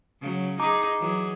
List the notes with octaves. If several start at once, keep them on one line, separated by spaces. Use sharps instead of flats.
C#3 F#3
D#4 G#4 A#5 D6
E3 F#3 G#4